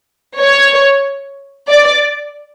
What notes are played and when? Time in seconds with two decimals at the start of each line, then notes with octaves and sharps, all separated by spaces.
0.37 C#5
1.69 D5